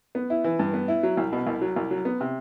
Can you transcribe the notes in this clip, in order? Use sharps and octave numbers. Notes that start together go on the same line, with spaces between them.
B3
E4
E3
G2
B3
E4
F#3
C2
B2
C2
F#3
C2
F#3
B3
C3